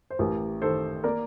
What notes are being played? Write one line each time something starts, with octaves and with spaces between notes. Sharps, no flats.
C5
A1 G4 A#4
D#3 A4 C5
A#3 A#4 D5